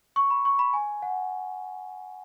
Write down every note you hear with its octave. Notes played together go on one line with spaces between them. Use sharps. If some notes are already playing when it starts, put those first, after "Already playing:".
C#6
B5
C#6
B5
G#5
F#5